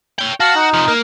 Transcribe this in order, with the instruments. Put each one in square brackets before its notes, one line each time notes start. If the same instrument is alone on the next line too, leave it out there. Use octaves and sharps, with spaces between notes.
[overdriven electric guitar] C#5 G5
[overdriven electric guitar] F#4 [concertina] F5 A5
[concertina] D#4
[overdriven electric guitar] C3 F3
A#3